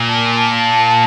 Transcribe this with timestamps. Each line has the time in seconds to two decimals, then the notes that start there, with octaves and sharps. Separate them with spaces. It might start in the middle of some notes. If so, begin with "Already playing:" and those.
Already playing: A#2
0.08 A5
0.37 A5